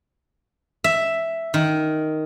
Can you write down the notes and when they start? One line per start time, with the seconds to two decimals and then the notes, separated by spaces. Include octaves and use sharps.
0.84 E5
1.54 D#3